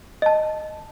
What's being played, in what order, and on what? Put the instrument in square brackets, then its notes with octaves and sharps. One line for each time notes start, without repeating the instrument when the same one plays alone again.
[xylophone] D#5 A5